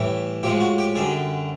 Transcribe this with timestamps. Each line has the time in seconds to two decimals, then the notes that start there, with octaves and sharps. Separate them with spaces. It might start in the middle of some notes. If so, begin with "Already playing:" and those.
Already playing: A2 E3 G3
0.43 A2 F3 G#3 G4
0.60 F#4
0.78 G4
0.95 F#2 D3 G3 G#4